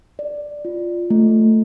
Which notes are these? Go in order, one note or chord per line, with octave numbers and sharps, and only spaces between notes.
D5
F4
A3